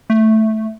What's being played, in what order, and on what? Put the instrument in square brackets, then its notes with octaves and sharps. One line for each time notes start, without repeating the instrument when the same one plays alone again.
[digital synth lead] A3